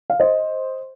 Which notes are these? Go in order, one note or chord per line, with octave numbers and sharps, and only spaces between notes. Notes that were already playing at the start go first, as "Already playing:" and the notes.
F5
C5 D#5